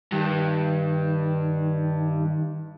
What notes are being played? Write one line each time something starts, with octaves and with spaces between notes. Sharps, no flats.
G2 D#3